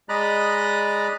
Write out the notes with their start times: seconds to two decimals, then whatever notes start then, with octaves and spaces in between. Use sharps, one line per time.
0.09 G#3 D5 D#5 A#5 B5 F#6